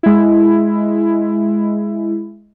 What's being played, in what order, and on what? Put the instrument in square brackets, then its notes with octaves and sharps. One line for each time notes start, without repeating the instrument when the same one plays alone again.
[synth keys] G#3 E4